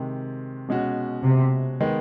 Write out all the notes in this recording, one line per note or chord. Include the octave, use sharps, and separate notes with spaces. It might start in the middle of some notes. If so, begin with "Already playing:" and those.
Already playing: C3 D#3 G#3
B2 G#3 C#4 F#4
C3
D#3 G#3 B3